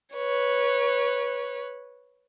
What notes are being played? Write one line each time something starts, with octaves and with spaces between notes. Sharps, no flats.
B4 C#5